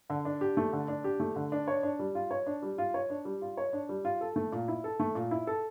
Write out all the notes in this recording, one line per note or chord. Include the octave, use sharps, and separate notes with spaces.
D3
D4
G4
A3
D3
D4
G4
A3
D3
D4
C#5
D4
G3
F4
C#5
D4
G3
F4
C#5
D4
G3
F4
C#5
D4
G3
F4
A4
A3
A#2
E4
A4
A3
A#2
E4
A4